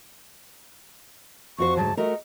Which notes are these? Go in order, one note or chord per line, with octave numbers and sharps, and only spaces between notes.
F2 F#4 C5 C#6
D2 G#2 F#3 A5
A3 F#4 A#4 D#5